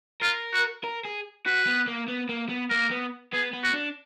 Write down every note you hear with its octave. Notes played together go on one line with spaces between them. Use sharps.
F4 A#4
F#4
A#4
G#4
F#4 B4
B3
A#3
B3
A#3
B3
A#3 A#4
B3
B3 G#4
B3
F#4
D4